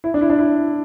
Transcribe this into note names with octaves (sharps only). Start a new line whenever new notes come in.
E4
D4
E4
D4
E4